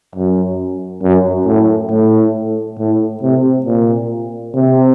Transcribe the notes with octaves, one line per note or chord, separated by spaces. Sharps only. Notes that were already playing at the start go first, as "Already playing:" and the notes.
F#2
F#2
A2
A2
A2
C3
A#2
C3